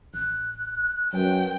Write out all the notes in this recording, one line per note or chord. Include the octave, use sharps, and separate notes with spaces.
A1 F#6
F#2 F#3 B4 G5